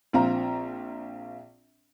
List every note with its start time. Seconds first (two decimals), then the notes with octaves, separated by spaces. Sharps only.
0.13 A#1 C4 F4 A#5